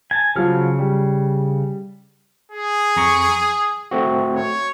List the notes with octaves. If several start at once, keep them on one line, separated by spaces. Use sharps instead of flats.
G#5 A5
C#3 F3 F#3 F4 F6
G3
G#4
F2 A#5 C#6
D#6
A3 C4 F#4
C#5